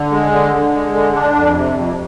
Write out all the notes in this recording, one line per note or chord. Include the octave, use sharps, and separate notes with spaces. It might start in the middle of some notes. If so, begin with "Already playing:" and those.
Already playing: D3
G#3
D3
D3
G#3
D3
D4
F2
C3
F2